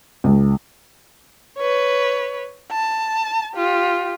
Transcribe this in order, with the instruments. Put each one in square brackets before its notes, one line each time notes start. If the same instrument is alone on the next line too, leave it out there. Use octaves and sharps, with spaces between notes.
[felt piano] C#2
[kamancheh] B4 C#5
A5
F4 G4